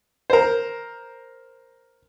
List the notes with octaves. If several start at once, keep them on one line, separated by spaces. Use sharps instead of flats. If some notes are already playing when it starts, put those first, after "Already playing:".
A#4 C5